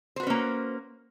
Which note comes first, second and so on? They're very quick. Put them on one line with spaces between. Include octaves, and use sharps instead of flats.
C5 F#4 B4 C#4 A#3